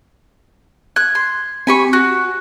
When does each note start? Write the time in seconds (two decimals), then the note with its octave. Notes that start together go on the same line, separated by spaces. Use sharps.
0.96 F#6 G#6
1.15 C6
1.67 C4 G4 G#5 B5 C#6
1.93 F#4 F#6